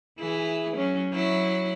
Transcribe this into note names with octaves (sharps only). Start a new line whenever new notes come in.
E3 E4 G#4
F#3 C#4
F#3 E4